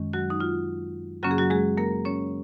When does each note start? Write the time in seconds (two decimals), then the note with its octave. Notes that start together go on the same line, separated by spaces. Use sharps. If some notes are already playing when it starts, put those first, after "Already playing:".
Already playing: F#2 D#3 G#3 C#4
0.13 F#3 F#4
0.30 D#4
0.40 F4
1.22 F#2 C#3 F#3 A#3 C#4 F#4
1.31 G#4
1.38 F#3 F#4
1.50 G#3 G#4
1.77 A#3 A#4
2.05 C#4 C#5